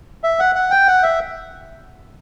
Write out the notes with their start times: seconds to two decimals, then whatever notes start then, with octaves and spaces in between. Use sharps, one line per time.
0.24 E5
0.39 F#5
0.55 F#5
0.71 G5
0.88 F#5
1.03 E5